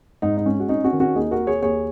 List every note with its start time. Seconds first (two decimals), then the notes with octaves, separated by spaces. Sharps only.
0.22 G#2 D#4
0.37 D#4
0.46 G#3 C#4
0.60 F#4
0.69 C#4 D#4
0.84 C#4 F#4
0.93 D#3
1.00 C#4 F#4
1.15 D#2 D#4 G#4
1.31 F#4 A#4
1.39 A#3
1.47 G#4 C#5
1.62 D#2 G#4 C#5